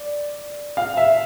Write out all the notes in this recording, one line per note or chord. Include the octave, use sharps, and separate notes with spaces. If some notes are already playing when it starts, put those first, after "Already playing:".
Already playing: D5
F5
E5